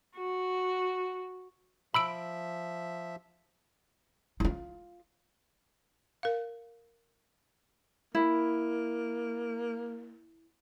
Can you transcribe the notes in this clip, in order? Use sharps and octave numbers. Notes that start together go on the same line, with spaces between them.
F#4
F3 E5 B5 E6 D7
E4 F4
A#4 F5
A#3 E4